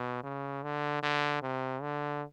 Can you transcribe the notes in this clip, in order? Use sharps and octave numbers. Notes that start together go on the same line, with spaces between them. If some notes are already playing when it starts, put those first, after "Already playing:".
Already playing: B2
C#3
D3
D3
C3
D3